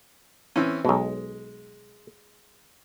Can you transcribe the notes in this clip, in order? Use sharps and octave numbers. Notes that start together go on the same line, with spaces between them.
E3 C4 C#4
B1 B2 G#3